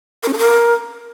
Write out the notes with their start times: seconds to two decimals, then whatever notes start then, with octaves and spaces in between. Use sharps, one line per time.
0.23 A#4
0.28 C#4
0.33 A4
0.38 A#4